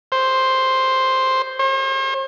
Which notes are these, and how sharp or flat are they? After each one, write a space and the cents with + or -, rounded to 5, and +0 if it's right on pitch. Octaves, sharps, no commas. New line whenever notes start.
C5 +5
C5 +45